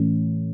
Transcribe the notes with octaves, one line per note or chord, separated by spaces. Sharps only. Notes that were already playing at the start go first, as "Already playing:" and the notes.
Already playing: A2 E3 A3 C#4